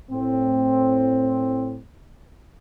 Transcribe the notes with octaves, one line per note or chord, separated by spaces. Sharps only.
A2 C4